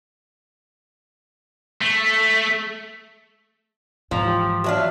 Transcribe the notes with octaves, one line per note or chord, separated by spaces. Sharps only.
A3
G#2 E3 F3 A#5
G4
F#3 D4 E5 F5